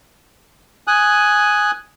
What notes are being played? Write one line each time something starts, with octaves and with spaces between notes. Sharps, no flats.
G#5 D#6 F#6